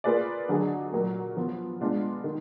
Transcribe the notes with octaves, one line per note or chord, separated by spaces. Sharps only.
A#3 F4 G#4 B4 D5
D3 F#3 D4 G#4 D#5
A#2 F#3 A#3
F3 B3 F4
G#3 B3 D4 F4
D#3